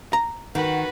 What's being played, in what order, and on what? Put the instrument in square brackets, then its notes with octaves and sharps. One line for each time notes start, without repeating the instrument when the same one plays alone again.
[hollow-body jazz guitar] A#5
[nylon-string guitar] D#3 [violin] F#4 B4 [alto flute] F#5